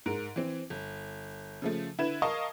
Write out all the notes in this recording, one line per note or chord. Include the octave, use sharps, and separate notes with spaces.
G#2 A#4 D7
E3 C4
G1
C#3 F3 A3
D3 E4 B4 G#6 E7
A#4 D#5 F5 A5 C#6 D#6